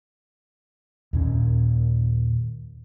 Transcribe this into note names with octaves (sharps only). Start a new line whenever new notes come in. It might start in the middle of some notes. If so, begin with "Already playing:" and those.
D#2 A#2 C#4